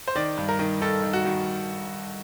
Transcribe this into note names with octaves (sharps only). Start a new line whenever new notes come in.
C5
D#3 D5
G2
A#4
D#3
D#3 A4
D#3
F#4
D#3